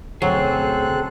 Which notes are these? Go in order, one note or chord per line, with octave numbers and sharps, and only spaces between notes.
D2 B2 F#3 C4 C#4 G#4 A4 F#6